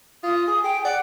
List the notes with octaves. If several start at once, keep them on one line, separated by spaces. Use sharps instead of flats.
F4 D#6
G#4
G#4 G5
D5 F#5